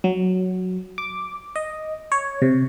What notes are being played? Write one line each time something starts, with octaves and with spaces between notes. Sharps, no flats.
F#3
D6
D#5
C#5
C3